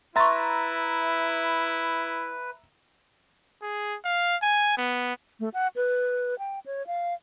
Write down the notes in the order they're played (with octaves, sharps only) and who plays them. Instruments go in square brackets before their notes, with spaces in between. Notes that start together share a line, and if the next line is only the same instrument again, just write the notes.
[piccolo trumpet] E4 [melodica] B4 [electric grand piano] E5 A#5 A6 [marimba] C6 C#6
[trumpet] G#4
F5
G#5
B3
[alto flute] A3
F#5
B4
G5
C#5
F5